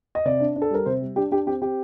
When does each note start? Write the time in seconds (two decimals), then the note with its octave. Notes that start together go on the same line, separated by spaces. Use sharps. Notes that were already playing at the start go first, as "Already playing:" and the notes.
0.15 D#5
0.25 C3 D5
0.40 D4
0.56 D4
0.62 A4
0.70 G3 A#4
0.86 C3 C5
1.01 G3
1.16 D4 G4
1.31 D4 G4
1.46 C4 G4
1.61 C4 G4